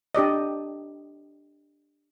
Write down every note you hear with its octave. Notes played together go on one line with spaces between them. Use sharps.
D4 G4 D5 D#5